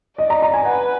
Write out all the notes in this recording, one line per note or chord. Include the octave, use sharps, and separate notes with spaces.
D5 D#5
A#5
A#5
G#5
B4 F#5